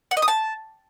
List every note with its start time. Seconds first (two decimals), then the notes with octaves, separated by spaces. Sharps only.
0.11 F#5
0.17 D#5
0.22 D#6
0.28 A5